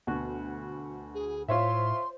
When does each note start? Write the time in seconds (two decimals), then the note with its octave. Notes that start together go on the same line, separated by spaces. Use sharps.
0.07 D2 B2 F#4
1.14 G#4
1.48 A2 F4 C5 C#5 E5 C6